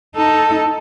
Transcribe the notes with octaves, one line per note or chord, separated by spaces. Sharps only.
D#4 A4